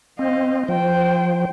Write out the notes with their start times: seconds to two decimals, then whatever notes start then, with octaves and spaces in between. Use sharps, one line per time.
0.19 C4 D#5 F5
0.68 F3 C5 G5